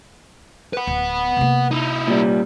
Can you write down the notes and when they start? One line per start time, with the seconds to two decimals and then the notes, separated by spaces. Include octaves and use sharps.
0.73 B4 F#5
0.87 D1
1.37 C3 A#3
1.71 D#4 E4
2.08 A#2 G3